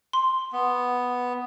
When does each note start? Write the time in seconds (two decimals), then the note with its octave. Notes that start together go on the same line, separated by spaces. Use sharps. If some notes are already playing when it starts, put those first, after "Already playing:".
0.13 C6
0.53 B3